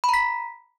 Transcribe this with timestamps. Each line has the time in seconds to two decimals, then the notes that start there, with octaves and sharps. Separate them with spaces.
0.04 B5
0.09 A#5
0.14 B6